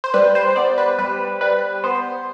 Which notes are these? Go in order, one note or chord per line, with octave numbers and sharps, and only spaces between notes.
C5
G3 B4
C5
B3 D5
B4
G3 B4
G3 B4
B3 C5